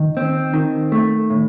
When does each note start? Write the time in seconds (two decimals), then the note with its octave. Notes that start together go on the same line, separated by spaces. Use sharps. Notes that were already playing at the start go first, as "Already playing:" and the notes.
Already playing: D#3
0.17 C4
0.53 D#3
0.92 A3
1.30 A2